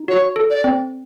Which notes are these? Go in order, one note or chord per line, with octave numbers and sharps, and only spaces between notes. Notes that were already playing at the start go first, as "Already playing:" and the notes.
Already playing: D#4
F#4 C#5
A4
D5
C4